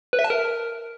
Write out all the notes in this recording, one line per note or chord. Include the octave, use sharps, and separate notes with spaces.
B4
E5
A5
A#4